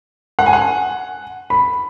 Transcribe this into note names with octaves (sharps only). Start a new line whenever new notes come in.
F#5
G#5
F#5
B5